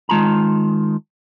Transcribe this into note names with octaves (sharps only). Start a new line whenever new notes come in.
D#3 G#3 F4 A5 A#5